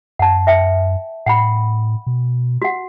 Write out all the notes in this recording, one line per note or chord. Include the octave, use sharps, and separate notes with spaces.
F#2 F#5 A5
E5 G5
A2 F#5 G5 B5
B2
F#4 F#5